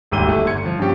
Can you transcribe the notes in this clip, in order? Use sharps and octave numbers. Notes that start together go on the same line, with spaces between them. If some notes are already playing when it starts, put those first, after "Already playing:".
D#1 G#1 D2 E6 D#7 G7
A3 E4
G1 G#6 C#7
F3
G2 A#2 C#4 G4